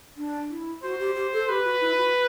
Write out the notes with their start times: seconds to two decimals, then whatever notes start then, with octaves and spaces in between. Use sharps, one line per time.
0.17 D4
0.50 E4
0.83 F#4 C5
1.00 G4
1.15 G4
1.33 A4
1.48 G4 B4
1.65 F#4
1.81 E4
1.98 F#4